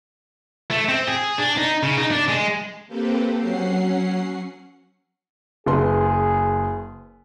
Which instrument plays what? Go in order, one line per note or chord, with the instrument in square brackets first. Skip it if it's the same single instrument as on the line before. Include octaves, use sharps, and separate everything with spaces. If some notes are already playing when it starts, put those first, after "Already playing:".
[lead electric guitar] A3
C4
G#4
D4
D#4
C#3
D#4
D4
G#3
[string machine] A#3 C4 G4 A4 B4 C5
F#3 C#4 F#5 C7
[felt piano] F#1 B4 C6 [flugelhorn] G#4